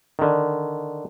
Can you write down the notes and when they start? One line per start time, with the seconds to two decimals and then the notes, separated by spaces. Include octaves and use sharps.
0.19 D3 D#3